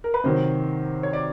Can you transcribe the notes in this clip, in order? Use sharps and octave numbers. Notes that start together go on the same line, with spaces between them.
A#4
B4
C3 D#3 F#3 C5
C#5
D5